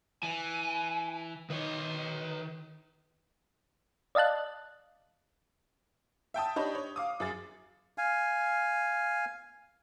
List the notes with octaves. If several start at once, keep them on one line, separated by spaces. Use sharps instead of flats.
E3 G#5
D#3 B4 C#5
D5 D#5 F5 A5 F#6
E5 G5 A5 D#6
D4 D#4 G4 C#5 D#5 B5
C#5
F5 D6 D#6
F#2 G#4 A6
F5 G#5